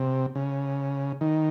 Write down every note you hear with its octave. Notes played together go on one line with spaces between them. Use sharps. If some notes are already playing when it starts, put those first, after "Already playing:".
Already playing: C3
C#3
D#3